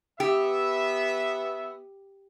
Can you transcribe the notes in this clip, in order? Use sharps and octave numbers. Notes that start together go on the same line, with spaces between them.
B3 G4 E5